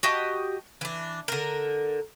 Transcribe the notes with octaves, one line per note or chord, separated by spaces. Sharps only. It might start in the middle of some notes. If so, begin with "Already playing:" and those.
F#4 G4 D#5 A5
E3 D4
D3 A#4